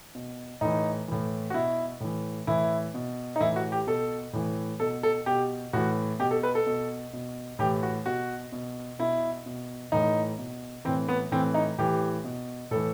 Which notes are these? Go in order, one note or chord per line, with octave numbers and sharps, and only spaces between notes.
B2
A2 E3 D#4
A2 E3
F#4
B2 E4
A2 E3
A2 E3 E4
B2
D#4
A2 E3 E4
F#4
G4
B2 A4
A2 E3
B2 A4
A4
B2 G4
A2 E3 F#4
B2 G4
A4
B4
A4
B2
B2
A2 E3 G4
F#4
B2 F#4
B2
B2 E4
B2
A2 E3 D#4
B2
A2 E3 C4
B3
A2 E3 C4
D#4
A2 E3 G4
B2
A2 E3 A4